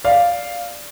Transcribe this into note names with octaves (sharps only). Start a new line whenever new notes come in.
D5 F5